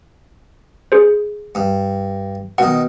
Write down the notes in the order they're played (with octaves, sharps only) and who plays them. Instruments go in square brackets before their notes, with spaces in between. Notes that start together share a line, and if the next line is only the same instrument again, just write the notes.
[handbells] G#4 C5
[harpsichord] G2
[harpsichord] B2 D#3 [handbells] F#5